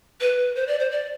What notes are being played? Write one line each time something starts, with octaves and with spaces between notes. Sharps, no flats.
B4
C5
D5
C5
D5